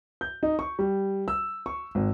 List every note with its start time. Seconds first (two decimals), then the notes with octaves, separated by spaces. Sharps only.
0.21 G6
0.43 D#4
0.59 C#6
0.79 G3
1.28 E6
1.66 C#6
1.95 G#1